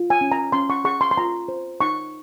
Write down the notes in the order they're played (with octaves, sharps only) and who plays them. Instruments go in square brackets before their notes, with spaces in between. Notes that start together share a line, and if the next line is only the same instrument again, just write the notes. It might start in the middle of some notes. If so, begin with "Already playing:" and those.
Already playing: [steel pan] F4
G#5
C#4
A#5
C#4 C6
C#6
G#4 C#6
C6
C6
F4 A#5
C5
D#4 C#6